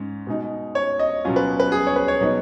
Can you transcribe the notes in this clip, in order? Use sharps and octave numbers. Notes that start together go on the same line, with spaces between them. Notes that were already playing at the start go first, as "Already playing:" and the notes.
Already playing: G#2 C#4
B2 G#3 D#4
C#5
D#5
B2 F#3 C#4 F4
B4
B4
G#4
C#5
B4
C#5
B2 F#3 B3 D#4